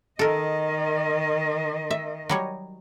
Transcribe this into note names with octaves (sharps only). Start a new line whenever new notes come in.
D#3 A4 A#4 D#5
E5
F#3 G3 C#5